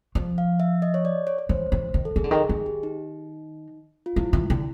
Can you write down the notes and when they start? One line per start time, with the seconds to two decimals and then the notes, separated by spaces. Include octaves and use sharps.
0.15 F3
0.38 F5
0.60 E5
0.82 D#5
0.94 C#5
1.05 D5
1.27 C#5
1.38 C#5
1.49 E3 C5
1.72 E3
1.94 D#3
2.05 A4
2.16 D#3 G#4
2.24 D3
2.31 D#3 G#4
2.49 D#3 G#4
2.66 G4
2.83 D#4
4.06 F4
4.16 F3 E4
4.33 E3
4.50 D3